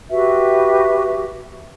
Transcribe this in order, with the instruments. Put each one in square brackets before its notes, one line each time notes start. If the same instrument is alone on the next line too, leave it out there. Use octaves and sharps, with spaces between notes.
[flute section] F#4 G4 B4 E5